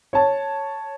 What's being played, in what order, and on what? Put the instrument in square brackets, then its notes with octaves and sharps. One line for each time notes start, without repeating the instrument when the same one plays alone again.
[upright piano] C#5 A5